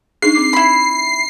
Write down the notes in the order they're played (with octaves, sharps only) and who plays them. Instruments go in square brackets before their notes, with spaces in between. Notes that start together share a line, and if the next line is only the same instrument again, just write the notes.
[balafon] D4 D#4 G#4 [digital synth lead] C7
[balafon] C4 D6
[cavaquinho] E4 B5